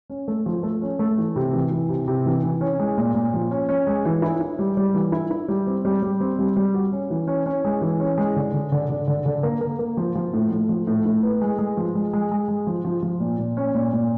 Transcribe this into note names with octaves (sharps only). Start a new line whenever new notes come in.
C#4
A3
F3
A3
C#4
A3
E3
C3
E3
E3
C3
C3
E3
E3
C#4
G#3
A#2
A#2
F3
C#4
C#4
G#3
E3
E4
E4
G3
G3
E3
E4
E4
G3
C4
G3
G3
C4
G3
G3
F#4
C#4
E3
C#4
C#4
G#3
E3
C#4
G#3
D3
D3
D3
D3
D3
D3
A#3
A#3
A#3
F3
F3
A2
A2
F3
A2
A2
B3
G#3
G#3
F3
G#3
G#3
G#3
G#3
F3
F3
F3
A#2
A#2
C#4
A#2
A#2